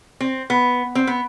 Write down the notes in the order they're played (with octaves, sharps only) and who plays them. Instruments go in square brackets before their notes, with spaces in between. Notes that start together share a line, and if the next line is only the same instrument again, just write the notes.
[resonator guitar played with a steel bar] C4
B3
C4
B3